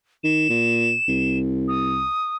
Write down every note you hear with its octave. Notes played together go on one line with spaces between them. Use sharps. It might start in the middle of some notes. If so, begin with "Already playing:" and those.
D#3 E7
A#2
C2
D#6